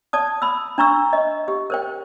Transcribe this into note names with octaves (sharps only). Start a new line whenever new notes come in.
D5 A5 D#6
B5 E6
D4 A#5 C#6 E6
D#5
G4
A#4 C5 G5